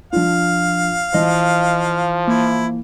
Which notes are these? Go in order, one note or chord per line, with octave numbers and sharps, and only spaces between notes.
F3 D4 F4 F5
E3 F3 D#5
A#3 E4